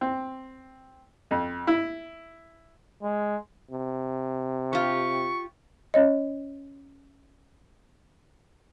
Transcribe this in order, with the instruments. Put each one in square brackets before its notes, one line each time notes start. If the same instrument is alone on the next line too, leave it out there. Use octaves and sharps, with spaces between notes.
[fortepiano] C4
F2
E4
[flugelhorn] G#3
[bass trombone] C3
[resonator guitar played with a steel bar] F4 G4 [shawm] C#6
[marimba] C#4 C#5 D#5